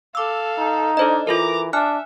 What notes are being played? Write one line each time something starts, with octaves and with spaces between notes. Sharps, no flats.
A4 F5 D6 E6
D#4
D4 A4 C5 D#5
E3 F4 A4 A#4 A#5 D6
D4 E5 G#5 F6 F#6